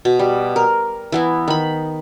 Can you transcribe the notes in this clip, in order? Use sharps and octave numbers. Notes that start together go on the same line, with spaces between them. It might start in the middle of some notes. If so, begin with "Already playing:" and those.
B2
G3
A#4
E3 B3 E4
D#3 B5